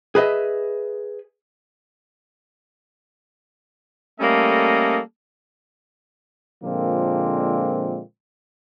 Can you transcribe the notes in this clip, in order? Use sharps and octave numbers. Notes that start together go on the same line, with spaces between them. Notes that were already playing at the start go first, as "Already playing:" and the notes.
G#4 B4 D#5 E5
G3 A3 A#3 C#4 A4 D#5
A#2 D3 F3 G#3 A#3 C4